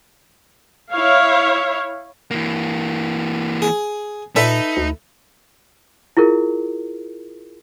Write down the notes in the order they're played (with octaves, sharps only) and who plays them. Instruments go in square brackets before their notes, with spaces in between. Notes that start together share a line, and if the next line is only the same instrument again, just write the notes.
[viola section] E4 C#5 E5 F5
[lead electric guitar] E3 A#3
[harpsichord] G#4
[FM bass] A#2 [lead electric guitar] D#4 [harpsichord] A4 B4 E5
[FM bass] D2
[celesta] E4 F4 G#4 A#4